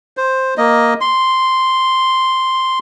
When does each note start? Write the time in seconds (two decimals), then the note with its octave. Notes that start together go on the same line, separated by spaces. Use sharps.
0.17 C5
0.58 A#3 D#5
1.01 C6